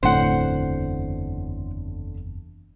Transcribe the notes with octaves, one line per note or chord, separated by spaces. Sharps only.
F#1 E2 A2 D3 C4 C5 F#5